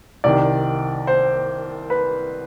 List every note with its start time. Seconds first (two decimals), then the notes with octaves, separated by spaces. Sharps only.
0.24 C2 C3 D#3 D5
1.07 C5
1.90 B4